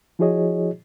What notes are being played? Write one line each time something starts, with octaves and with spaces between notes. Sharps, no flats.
F3 E4 F#4 G#4 C#5 D#5